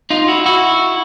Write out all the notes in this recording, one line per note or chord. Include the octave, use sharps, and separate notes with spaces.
D#4 F4
E4 F#4
E4 F#4